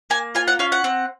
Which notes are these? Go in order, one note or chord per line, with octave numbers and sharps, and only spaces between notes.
A#3 G#5
F4 G#5
F#5
C#4 F5
F#5
C4